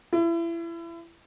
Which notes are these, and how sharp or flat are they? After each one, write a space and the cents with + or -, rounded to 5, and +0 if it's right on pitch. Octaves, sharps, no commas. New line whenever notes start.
E4 +30